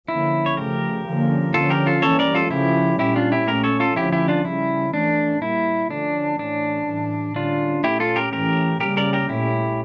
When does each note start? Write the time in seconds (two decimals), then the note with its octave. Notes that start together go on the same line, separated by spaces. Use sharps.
0.08 D3 F3 A#3 C#4 E4
0.46 C#5
0.57 C#3 F3 A3 G4 A#4
1.06 D3 F3 A#3 C#4
1.54 D3 F3 C#4 F4 A4
1.70 G4 A#4
1.87 F4 A4
2.02 E3 G3 A#3 C#4 A4 C#5
2.19 A#4 D5
2.35 F4 A4
2.51 C#3 F3 A3 C#4 E4 G4
2.99 A#2 G3 C#4 E4 G4
3.16 D4 F4
3.32 E4 G4
3.47 A#2 A3 C#4 G4 A#4
3.64 A4 C#5
3.80 F4 A4
3.96 D3 F3 A3 C#4 E4 G4
4.12 E4 G4
4.28 D4 F4
4.45 C#3 G3 C#4 E4
4.94 E3 A3 C#4 D4
5.42 A#2 G3 A#3 E4
5.90 D3 F3 A3 C#4 D4
6.39 A2 E3 A3 C#4 D4
6.87 A2 E3 G3
7.35 D3 G3 C#4 D4 F4
7.84 A#2 A3 C#4 E4 G4
8.00 F4 A4
8.16 G4 A#4
8.32 A2 E3 A3 C#4 G4 A#4
8.80 C#3 G3 A#3 C#4 G4 A#4
8.97 A#4 D5
9.13 G4 A#4
9.29 A#2 A3 C#4 E4 G4